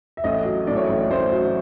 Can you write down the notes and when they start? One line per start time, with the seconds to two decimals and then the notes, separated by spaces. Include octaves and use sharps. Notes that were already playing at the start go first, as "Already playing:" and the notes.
0.17 E5
0.24 A1 D#5
0.45 F#3
0.67 A2 D5
0.77 C#5
0.84 D5
0.89 A1
1.11 A1 C5
1.32 F#3